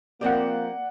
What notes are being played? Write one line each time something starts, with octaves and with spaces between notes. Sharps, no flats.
F3 A#3 C4 G4 D5 F#5